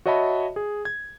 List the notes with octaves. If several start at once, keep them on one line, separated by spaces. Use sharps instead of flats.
F#4 C#5 D#5 E5 A5 B5
G#4
G#6